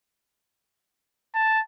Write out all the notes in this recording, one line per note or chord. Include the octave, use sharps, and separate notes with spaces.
A5